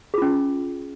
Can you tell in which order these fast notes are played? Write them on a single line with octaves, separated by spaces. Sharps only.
G#4 F4 C#4